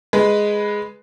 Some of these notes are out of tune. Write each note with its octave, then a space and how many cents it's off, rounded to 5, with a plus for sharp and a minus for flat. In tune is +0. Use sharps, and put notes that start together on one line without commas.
G#3 +0 B4 +0